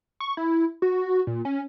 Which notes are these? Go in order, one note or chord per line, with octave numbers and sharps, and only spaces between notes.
C#6
E4
F#4
A#2
C#4